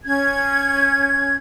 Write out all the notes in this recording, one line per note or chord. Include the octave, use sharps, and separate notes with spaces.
C#4 G#6